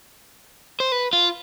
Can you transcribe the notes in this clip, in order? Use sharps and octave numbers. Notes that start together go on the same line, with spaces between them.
C5
B4
F4